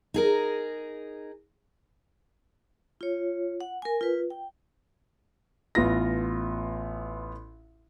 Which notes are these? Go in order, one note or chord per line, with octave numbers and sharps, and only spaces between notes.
D#4 G#4 A#4
F4 C#5
F#5
A#4 G#5
F4 B4
G5
A1 B3 F4 A#6